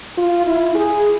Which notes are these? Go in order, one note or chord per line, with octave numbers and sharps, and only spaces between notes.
F4
E4
G#4